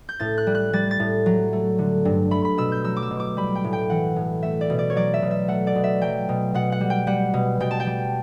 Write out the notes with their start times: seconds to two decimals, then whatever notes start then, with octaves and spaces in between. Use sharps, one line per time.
0.09 G6
0.19 A2 A6
0.38 F#6
0.47 G3
0.55 F#6
0.73 G3 A6
0.91 A6
1.00 A2
1.26 F#3
1.53 A3
1.79 D3
2.05 G2
2.31 A3 B5
2.45 B5
2.58 B2 E6
2.72 G6
2.84 F#3 E6
2.96 D6
3.02 E6
3.11 B2
3.20 D6
3.37 G3 B5
3.55 G5
3.64 A2
3.73 G5
3.90 E3 F#5
4.16 A2
4.43 A3 E5
4.61 D5
4.70 B2
4.79 D5
4.90 C#5
4.96 F#3 D5
5.14 E5
5.22 B2
5.31 E5
5.48 A3 F#5
5.67 D5
5.76 B2
5.84 E5
6.02 F#3 G5
6.29 B2
6.54 B2 F#5
6.72 F#5
6.81 G3
6.90 G5
7.07 G3 F#5
7.34 B2
7.60 B2 G5
7.71 A5
7.80 G5
7.86 G3